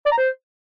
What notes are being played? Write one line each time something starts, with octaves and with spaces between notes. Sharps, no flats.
D5
A#5
C5